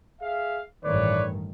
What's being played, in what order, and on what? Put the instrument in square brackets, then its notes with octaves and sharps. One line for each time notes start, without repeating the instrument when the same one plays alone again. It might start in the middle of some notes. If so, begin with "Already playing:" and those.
[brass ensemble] G#4 E5 F5
[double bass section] A1 G2 D#3 [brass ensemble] A3 B4 C#5 [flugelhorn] D5